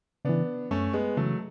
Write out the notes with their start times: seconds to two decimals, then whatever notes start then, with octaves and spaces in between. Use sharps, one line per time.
0.25 C#3 E3 B3 D4
0.71 F#2 A3 C#4
0.93 G#3 B3
1.17 C#3 E3 F#3 A3